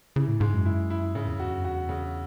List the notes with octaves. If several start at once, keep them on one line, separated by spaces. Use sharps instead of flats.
C#3 E3
A2
G#2 G#3
F#2
E4
E4
G#2 C#3
E2
F#2
E2 F#4
F#2
E2 F#4
C#3